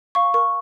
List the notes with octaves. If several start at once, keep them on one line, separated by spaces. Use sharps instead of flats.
F5 C#6
A#4 C#6